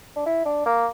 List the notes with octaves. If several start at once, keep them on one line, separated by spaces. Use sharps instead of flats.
D4
E4
D4
A#3